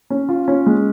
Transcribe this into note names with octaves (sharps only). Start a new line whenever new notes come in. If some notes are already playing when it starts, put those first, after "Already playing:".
C#4
F4
C#4
G#3